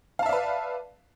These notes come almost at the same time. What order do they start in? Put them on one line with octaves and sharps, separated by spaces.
F5 A5 E5 D5 B4